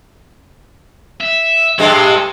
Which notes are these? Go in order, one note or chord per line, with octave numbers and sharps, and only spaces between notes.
E5
G2 G#3 E4 A4